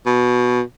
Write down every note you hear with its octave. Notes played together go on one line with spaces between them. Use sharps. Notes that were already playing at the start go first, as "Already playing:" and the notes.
B2